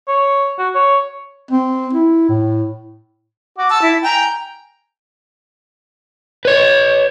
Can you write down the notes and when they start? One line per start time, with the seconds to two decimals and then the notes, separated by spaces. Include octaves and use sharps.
0.08 C#5
0.59 F#4
0.75 C#5
1.51 C4
1.94 E4
2.29 A2
3.58 F#4 D6
3.70 A5 E6
3.82 E4
4.04 G5 G#5 A#5
6.45 B4 C#5